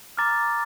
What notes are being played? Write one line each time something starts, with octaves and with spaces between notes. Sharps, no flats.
A#5 D6 F6 A6